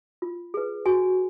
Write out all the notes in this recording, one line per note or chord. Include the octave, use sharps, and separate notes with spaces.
F4
G#4 B4
F#4 G#5